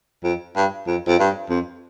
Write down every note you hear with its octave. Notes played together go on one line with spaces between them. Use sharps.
F2
G2
F2
F2
G2
F2